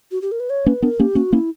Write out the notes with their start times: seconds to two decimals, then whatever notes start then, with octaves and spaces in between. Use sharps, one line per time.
0.12 F#4
0.22 G4
0.32 A#4
0.40 B4
0.50 C#5
0.66 A#3 C#4 B4
0.82 B3 D4 A#4
0.99 A#3 C#4 G4
1.15 A#3 C#4 F#4
1.32 A#3 C#4 E4